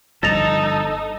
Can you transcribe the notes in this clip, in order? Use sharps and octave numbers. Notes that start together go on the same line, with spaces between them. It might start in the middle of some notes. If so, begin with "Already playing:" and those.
G1 G2 F3 D#4 A4 A6 A#6 F7